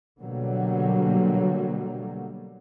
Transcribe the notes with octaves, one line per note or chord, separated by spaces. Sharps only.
B2 D3 F#3 G3 A#3